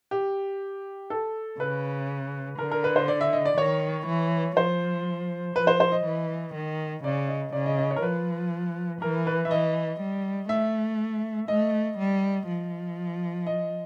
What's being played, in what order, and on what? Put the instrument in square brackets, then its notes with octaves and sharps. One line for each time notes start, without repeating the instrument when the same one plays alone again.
[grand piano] G4
A4
[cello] C#3 [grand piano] B4
[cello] D3 [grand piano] A#4
[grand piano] A#4
B4
C5
D5
E5
D#5
D5
[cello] D#3 [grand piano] C#5
[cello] E3
[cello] F3 [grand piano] C5
[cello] F3 [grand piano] B4
[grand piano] C5
C5
D#5
[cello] E3
D#3
[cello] C#3 [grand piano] D5
[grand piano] D#5
[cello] C#3 [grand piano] D5
[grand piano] D#5
D#5
C#5
A#4
[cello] F3 [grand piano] B4
[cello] E3 [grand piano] A#4
[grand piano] B4
E5
[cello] E3 [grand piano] D#5
[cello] G3
[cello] A3 [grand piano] E5
[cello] A3 [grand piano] D#5
[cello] G3
F3
[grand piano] D#5